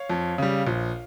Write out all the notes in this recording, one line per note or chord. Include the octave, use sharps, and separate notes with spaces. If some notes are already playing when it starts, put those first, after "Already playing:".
Already playing: C#5 F5
F2
C#3 G3
A#1